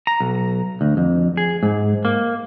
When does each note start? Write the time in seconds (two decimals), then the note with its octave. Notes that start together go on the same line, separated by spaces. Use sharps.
0.07 A#5
0.20 B1
0.81 D2
0.97 F2
1.37 G#4
1.63 G#2
2.05 A#3